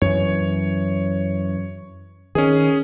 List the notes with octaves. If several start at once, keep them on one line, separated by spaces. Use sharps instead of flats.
F#2 E3 C#5
D#3 C#4 G#4